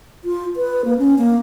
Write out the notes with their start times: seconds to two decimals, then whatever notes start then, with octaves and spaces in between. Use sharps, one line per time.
0.24 F4
0.56 B4
0.85 A#3
0.99 C#4
1.18 A#3